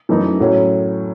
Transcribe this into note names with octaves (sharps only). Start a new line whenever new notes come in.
F#2 E3 A3 D#4 A4
A2 F#3 C#4